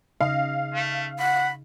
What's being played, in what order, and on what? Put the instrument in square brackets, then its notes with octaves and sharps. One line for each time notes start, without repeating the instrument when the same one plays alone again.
[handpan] C#3 D#4 D#5 [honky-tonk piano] F5
[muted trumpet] A3
[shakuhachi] F#5 [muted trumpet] B5